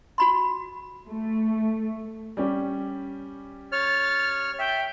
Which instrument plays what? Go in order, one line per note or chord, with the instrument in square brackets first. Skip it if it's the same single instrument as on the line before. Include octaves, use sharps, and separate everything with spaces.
[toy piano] F#4 B5 C6
[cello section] A3
[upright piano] G3 C#4 G4
[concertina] C#5 F6 [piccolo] A6
[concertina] E5 [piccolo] G5